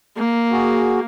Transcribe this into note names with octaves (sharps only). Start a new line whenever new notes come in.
A#3
F#4 G#4